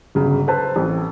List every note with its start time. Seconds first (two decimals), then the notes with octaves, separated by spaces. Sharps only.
0.15 G1 C#3 F#3
0.48 A4 B4 C5 A5
0.76 A1 C4